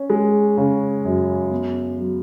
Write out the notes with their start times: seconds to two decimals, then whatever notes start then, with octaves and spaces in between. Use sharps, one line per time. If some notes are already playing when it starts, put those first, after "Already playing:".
Already playing: C#4
0.10 G#3
0.58 C#3
1.05 F#2
1.51 B3
1.98 F#3